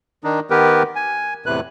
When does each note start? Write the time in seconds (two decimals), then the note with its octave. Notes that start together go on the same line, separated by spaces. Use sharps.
0.24 D#3 D4 D#4
0.50 D#3 B3 G4 A#4 B4
0.95 G#5
1.46 E2 A2 C3 B4 F#6